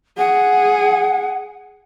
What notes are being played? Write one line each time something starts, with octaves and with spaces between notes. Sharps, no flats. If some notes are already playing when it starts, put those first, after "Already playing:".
G#4 F#5